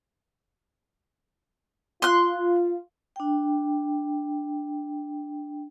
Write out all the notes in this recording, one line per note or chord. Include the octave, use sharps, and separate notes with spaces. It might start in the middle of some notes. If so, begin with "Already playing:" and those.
F4 C6 F#6
D4 G5